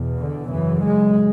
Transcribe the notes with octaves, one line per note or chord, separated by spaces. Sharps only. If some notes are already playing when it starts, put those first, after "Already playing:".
Already playing: E2 B2
D3
F#2 C#3 E3
G#3